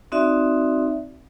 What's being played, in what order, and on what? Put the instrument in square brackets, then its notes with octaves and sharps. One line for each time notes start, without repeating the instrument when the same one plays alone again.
[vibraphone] C4 D#4 F#4 D5 E5